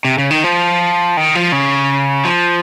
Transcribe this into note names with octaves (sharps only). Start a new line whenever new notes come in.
C3
C#3
D#3
F3
D#3
F3
C#3
F3